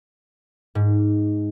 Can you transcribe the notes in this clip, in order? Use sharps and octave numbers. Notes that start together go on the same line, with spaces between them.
G#2